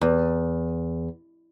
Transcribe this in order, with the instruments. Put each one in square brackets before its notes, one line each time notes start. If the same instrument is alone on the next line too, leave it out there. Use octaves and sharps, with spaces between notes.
[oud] E2